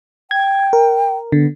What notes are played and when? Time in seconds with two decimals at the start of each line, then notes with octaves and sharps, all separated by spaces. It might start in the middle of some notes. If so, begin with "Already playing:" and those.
0.31 G5 G#6
0.73 A#4
1.32 D3 B3